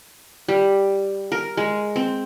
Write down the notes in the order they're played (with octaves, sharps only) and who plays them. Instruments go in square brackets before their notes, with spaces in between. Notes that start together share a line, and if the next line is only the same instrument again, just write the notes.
[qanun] G3
A#4
G#3
C4